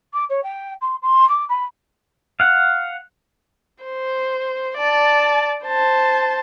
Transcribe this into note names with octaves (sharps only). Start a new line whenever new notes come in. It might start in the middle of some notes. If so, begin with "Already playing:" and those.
D6
C#5
G5
C6
C6
D6
B5
F5 F#5
C5
D5 A5
C5 A5